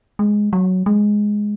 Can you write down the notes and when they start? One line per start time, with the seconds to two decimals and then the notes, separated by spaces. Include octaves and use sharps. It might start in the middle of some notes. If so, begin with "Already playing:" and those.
0.19 G#3
0.53 F#3
0.86 G#3